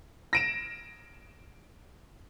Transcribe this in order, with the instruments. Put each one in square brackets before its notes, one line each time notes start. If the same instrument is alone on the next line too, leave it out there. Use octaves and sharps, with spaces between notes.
[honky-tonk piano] A#6 D7 E7